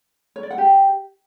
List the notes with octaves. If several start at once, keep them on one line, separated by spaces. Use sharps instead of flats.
C#5
D5
F#5
G4